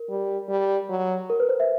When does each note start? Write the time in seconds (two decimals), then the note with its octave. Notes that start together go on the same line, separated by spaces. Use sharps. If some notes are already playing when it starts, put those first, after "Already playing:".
Already playing: A#4
0.10 G3
0.49 G3
0.89 F#3
1.30 A#4
1.40 B4
1.49 C5
1.60 E5